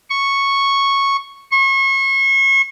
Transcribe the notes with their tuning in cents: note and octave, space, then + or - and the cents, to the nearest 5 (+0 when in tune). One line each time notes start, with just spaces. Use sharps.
C#6 -5
C#6 -35